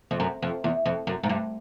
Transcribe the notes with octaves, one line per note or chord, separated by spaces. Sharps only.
F2
F#2
F2
E2
F2
F#2
G#2
G2